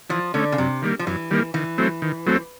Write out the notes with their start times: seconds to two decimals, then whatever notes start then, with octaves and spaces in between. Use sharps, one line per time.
0.09 E3 F3
0.34 D3 A3 C#4
0.52 C#3
0.58 F#2 C3
0.82 D#3 G3 A#3
0.99 F3
1.06 F#2 E3
1.31 D#3 G3 A#3
1.54 D#3 E3
1.78 F#3 A3 C4
2.02 D#3
2.26 F#3 A3 C4